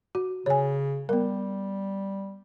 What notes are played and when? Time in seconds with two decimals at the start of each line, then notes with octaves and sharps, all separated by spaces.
0.15 F#4
0.46 C#3 C#5 G#5
1.09 G3 B3 A#4